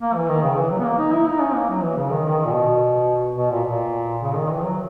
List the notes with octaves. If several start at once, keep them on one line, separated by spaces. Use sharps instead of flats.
A#3
E3
D#3
C#3
E3
F#3
B3
A#3
D#4
E4
D#4
C#4
A#3
F#3
E3
C#3
D#3
D#3
A#2
B2
B2
A#2
A#2
C#3
D#3
E3
F#3